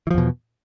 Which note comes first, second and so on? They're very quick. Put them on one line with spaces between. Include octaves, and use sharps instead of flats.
E3 F3 E2 B2